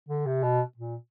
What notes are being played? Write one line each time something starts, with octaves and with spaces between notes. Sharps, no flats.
D3
C3
B2
A#2